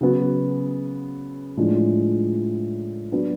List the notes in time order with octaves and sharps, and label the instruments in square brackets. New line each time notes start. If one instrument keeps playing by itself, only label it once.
[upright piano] C#3 F#3 B3 F#4
A2 F3 G#3 D4
F#3 B3 D4